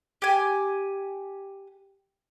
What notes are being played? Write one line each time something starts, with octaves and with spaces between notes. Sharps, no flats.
G4 G#5